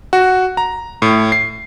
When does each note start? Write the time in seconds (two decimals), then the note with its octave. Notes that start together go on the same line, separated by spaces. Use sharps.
0.13 F#4
0.57 A#5
1.02 A2
1.32 C7